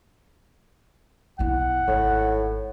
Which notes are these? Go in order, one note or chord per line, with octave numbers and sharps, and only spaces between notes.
B1 E4 F#5
G#1 A2